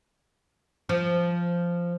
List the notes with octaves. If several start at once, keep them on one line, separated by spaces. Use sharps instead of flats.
F3